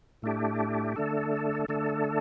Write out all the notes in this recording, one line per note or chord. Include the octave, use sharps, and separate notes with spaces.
A2 A3 D4 G4
D3 A3 D4 A4
D3 A3 D4 A4